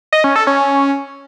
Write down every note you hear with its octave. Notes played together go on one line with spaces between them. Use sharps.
D#5
C#4
A4
C#4